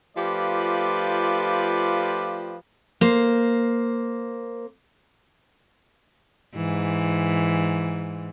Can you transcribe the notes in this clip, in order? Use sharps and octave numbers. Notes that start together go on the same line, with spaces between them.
F3 A3 F4 G4 B4 D5
A#3 C5
G#2 E3